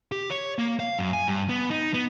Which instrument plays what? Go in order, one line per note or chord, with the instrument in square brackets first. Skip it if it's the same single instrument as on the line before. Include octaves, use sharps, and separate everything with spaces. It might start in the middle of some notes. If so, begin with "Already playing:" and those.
[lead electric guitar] G4
C#5
A#3
F5
F#2
G#5
G2
B3
D#4
B3